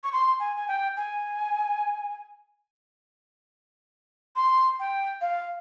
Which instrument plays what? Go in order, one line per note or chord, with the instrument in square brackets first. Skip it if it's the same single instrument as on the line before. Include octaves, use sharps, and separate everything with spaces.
[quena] C#6
C6
G#5
G#5
G5
G#5
C6
G5
F5